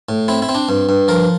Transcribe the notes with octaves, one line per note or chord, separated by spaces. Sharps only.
A2
C4 E4
E4
C4
D4
G2
G2
F3 A#4